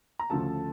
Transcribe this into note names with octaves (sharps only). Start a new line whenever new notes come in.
A#5
D2 C#3 F3 A3 A4 A5